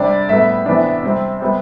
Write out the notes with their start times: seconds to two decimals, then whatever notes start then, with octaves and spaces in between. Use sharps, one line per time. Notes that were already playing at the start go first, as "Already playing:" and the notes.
Already playing: C3 G3 D4 D5
0.29 A2 G3 B3 E5
0.66 C3 E3 B3 D4
1.03 C3 G3 C4
1.41 C3 G3 B3